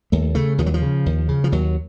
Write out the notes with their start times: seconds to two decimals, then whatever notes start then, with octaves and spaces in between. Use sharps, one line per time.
0.12 D#2 A3
0.35 C#3 A3
0.58 D#2 F3
0.66 F#3
0.74 F3
0.82 C#3
1.06 D#2
1.29 C#3
1.44 F3
1.52 D#2 F#3